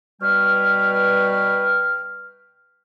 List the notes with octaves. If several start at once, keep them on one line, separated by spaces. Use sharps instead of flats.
B2 G3 B4 C#5 G5 F6